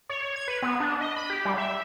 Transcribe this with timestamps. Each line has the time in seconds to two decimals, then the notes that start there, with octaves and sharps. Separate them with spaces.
0.09 C#5
0.23 C#5
0.36 G#6
0.48 B4
0.62 B3
0.80 D4
1.01 D#5
1.16 B5
1.30 G4
1.45 G3
1.58 E5